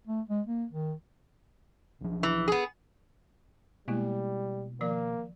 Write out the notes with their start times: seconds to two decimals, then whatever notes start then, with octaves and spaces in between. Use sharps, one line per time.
0.07 A3
0.29 G#3
0.47 A#3
0.72 D#3
2.01 B1 F3
2.23 E3
2.48 B3 G#4
3.88 B2 G3 G#3 A#3 E4
4.81 D#3 F3 A#3 D5